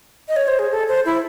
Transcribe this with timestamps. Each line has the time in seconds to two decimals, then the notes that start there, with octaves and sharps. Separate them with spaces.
0.28 D#5
0.36 C#5
0.48 C5
0.59 G#4
0.71 A4
0.88 C5
1.06 E4